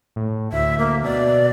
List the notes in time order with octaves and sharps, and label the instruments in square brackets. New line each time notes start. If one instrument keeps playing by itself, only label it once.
[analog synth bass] A2
[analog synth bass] D2 [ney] E5
[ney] A#3
[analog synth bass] B2 [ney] D5